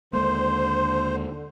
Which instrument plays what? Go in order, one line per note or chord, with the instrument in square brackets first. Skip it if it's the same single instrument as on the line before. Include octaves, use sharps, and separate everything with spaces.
[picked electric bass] D#2 G#3 A#3 [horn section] D3 [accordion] C5 [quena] C6